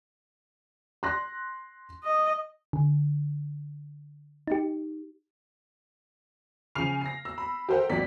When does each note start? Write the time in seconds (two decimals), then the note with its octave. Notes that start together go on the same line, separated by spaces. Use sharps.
1.03 C6 F#6 A#6
2.04 D#5
2.73 D3
4.48 D#4 G4
6.75 C#3 F3 G#5 F6 C7 F7
7.01 A#6 C7
7.25 E6
7.38 B5
7.69 G4 A4 A#4 C5 F#5 G5
7.90 G#1 D#2 F3 F#3 D5 B6